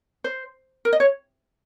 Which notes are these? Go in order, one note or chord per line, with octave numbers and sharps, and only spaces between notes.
C5
A#4
D#5
C#5